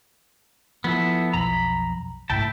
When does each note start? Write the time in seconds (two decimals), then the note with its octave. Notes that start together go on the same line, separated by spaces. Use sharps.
0.84 F3 B3 E4 A4
1.33 B1 F2 A#5 B5
2.30 C2 G#2 A3 E4 G5 A5